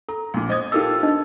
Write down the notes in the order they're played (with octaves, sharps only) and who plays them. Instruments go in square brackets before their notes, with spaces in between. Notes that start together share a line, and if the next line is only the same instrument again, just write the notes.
[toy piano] A4 [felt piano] A#5
[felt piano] A#1 A#2 [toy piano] G#5
[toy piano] C5 D#6 [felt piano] D#5 G#6
[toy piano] D#4 A#4 E6 [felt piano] F4 G4 A4
[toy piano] D4 D#4 D#5